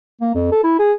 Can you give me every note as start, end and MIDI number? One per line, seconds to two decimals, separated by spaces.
0.21 0.31 58
0.35 0.47 41
0.52 0.63 69
0.64 0.76 64
0.79 0.93 68